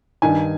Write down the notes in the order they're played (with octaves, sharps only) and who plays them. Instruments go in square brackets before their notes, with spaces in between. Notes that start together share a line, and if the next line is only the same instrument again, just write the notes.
[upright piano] G2 D#3 G#5